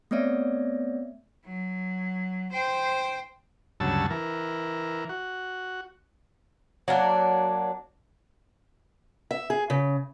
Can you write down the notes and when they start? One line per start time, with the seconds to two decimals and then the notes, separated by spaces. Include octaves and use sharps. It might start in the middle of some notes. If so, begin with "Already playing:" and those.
0.11 A3 B3 C4 C#5 D5 E5
1.45 F#3
2.53 C5 G5
3.80 D2 G2 C#3 F#3 A5 E6
4.10 E3 A#4
5.09 F#4
6.88 F#3 A#3 D4
9.31 E5
9.50 G#4
9.70 C#3